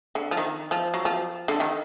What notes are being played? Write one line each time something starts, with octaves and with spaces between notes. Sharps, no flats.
D3
F3
D#3
F3
F#3
F3
D3
D#3